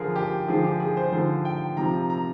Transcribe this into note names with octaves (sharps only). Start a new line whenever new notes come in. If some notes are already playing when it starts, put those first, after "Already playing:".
Already playing: D3 F3 G#4 A#4
G4
D3 F3 G#4
G4
G#4
C5
D3 F3 C5
G5
C3 F3 A#5
A#5
A#5